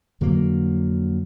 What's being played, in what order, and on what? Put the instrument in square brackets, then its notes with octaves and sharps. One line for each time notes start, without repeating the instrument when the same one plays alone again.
[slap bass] F2 D3 F#3 A#3